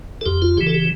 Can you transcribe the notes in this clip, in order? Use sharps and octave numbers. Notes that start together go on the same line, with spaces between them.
A4
F2 G4
F4
C#3 E3 G4
A4
G4